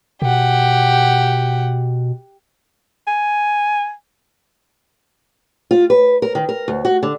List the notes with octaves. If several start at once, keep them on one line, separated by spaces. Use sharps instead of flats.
B2 G4 F#5
G#5
F4
B4
A#4
D#3
A#4
D2
F#4
D3